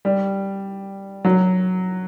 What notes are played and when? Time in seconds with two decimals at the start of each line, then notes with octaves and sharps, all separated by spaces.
0.05 G3
1.25 F#3